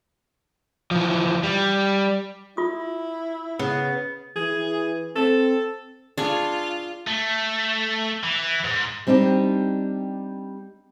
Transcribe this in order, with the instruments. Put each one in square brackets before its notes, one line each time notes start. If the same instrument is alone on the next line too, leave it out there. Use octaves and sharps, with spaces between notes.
[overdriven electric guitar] E3 F3
G3
[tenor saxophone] E4 [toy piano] F4 D#6
[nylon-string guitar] C#3 [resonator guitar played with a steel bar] B3
[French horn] E3 [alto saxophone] G#4
[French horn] C4 [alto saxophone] A4
[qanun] D4 G#4 C#6 [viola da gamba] F4
[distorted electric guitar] A3
E3
G#2
[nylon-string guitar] G3 C4 D4 D#4 G4